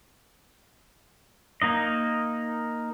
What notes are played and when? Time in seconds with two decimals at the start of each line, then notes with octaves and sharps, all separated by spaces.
1.62 A#3 D#4 D#5